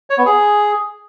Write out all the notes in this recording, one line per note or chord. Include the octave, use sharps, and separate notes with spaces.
C#5
B3
G#4